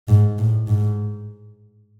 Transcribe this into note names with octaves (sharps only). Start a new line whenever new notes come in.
G#2
A2
G#2